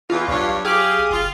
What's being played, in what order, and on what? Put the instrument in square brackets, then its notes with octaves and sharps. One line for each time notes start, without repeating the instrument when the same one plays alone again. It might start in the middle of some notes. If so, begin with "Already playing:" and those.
[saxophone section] E2 [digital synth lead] F4
[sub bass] B1 [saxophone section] G2 C#5
[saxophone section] G4 F5 [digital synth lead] G#4
[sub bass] F#1 [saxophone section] F4